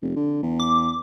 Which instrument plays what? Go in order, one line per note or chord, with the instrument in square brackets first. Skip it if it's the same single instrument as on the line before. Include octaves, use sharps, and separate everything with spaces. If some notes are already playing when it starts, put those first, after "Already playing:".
[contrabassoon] F1
D3
E2
[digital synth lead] D6